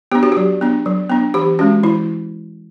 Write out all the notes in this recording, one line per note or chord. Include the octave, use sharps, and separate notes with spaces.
B3 D4 G4
F#4
F#3 G4
B3 D4
F#3
B3 D4
E3 G4
G#3 C#4 F#4
E3 E4